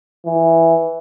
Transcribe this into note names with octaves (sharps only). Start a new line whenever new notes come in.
E3